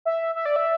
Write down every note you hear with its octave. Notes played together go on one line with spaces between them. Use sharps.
E5
E5
D5
E5